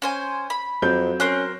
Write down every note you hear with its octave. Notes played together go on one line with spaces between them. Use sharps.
C#4 C5 G#5
B5
F2 F#3 C4 G6
C#4 A#4 C5 F#6